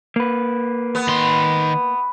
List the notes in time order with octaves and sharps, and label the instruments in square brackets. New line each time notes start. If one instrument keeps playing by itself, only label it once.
[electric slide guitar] A#3 B4
[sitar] B3
[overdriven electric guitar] D#3 C6